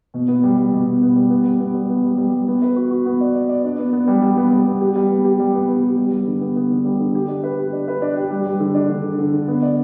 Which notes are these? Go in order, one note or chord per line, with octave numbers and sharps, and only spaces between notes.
B2
B3
G3
G3
B2
B2
B3
G3
B3
G3
B3
G3
B3
G3
G3
G3
B3
B4
F#4
F#4
B3
D5
D5
D5
D4
B3
B3
G3
G3
B3
G3
B3
G4
G3
B3
G4
G3
B3
B3
G4
G3
G3
D3
B3
B3
D3
G3
D3
G4
D4
B4
G4
D4
B4
D4
G4
G3
G3
D3
D4
D3
D3
D3
D3
B3
D5